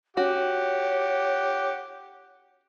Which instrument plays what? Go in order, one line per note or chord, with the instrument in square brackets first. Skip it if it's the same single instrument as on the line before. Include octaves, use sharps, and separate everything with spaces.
[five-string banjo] C#4 F#4 [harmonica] G4 F#5 [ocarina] C#5